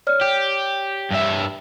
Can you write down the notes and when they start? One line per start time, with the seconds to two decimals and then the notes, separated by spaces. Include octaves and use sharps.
0.07 C#5 D5 F6
0.21 G4
1.11 G2 E5